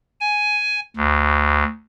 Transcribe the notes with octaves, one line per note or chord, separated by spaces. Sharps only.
G#5
D2